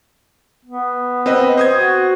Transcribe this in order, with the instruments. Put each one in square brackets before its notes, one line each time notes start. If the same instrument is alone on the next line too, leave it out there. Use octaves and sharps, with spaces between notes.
[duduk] B3
[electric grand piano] C4 B4 D#5
C5 D#6 G#6
[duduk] F#4